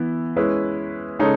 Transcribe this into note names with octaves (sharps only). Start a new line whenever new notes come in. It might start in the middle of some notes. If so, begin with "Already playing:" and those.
Already playing: E3 B3 E4
G#3 C#4 E4 B4
C#3 G#3 D#4 A4 C#5